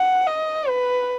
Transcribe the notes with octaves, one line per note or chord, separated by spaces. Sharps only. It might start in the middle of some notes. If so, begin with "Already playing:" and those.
Already playing: F#5
D#5
B4